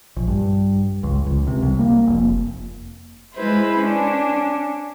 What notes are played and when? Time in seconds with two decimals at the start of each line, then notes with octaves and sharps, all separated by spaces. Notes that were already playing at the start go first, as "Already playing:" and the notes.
0.16 A#1
0.28 G2
1.03 C#2
1.26 C#2
1.47 C3
1.63 C2
1.79 A#3
2.07 F1
3.35 G#3 E4 B4 C5
3.79 C#4 D4